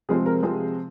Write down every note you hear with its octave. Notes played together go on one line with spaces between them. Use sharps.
C3 F3 G#3 C4 G#4
A#4
C3 F3 G#3 C4 G#4